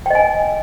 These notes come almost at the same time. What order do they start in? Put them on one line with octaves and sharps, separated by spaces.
G5 D#5 G#5